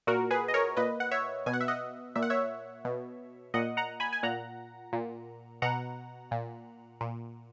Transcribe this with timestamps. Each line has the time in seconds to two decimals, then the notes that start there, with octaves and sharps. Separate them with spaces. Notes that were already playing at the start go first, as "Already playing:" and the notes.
0.07 A#2 F#4 A#4
0.31 G#4 B4
0.48 D#5
0.54 A#4 C#5
0.77 A#2 B4 D#5
1.00 F#5
1.11 C#5 E5
1.46 B2 G#5
1.53 F#5
1.61 E5
1.68 D#5 F#5
2.15 A#2 E5
2.22 F#5
2.30 C#5 E5
2.85 B2
3.54 A#2 D#5 F#5
3.77 F#5 A#5
4.00 G#5 B5
4.13 G#5
4.23 A#2 F#5 A#5
4.93 A#2
5.62 B2 F#5 A#5
6.31 A#2
7.01 A#2